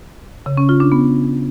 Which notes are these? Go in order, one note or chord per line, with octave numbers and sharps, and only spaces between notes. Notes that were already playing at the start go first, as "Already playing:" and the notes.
C#3
C#4
F4
D4
B3